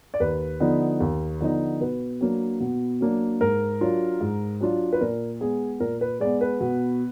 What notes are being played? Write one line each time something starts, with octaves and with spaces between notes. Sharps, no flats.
D5
D#2 B4
D3 F3 B3 D#4
D#2
D3 F3 B3 D#4
B2 B4
F#3 A#3 D4
B2
F#3 A#3 D4
G#2 A#4
F#3 D4 F4
G#2
F#3 D4 F4
B4
A#2 A#4
G#3 B3 G#4
A#2 A#4
B4
G#3 B3 D5
B4
B2